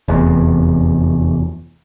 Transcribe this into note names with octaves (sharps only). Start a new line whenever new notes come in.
F1 E2